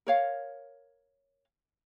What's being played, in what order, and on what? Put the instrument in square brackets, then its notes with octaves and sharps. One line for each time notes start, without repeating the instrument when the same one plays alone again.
[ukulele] A#4 C#5 F5